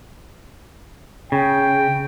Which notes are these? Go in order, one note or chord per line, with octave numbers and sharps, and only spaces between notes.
C#3 G5